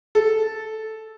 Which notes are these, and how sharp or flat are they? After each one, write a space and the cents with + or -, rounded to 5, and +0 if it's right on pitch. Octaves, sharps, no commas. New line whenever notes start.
A4 -5